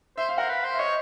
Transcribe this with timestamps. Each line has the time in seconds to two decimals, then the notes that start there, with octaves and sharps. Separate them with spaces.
0.18 C5 E5
0.29 F5
0.38 A#4 F#5
0.48 B4 F5
0.64 C5
0.74 E5
0.79 C#5 D#5